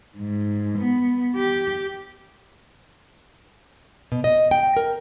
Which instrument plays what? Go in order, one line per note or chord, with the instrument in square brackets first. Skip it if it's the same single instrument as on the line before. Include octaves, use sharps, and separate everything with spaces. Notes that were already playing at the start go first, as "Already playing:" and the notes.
[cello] G#2
B3
G4
[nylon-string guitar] B2
D#5
G5
A#4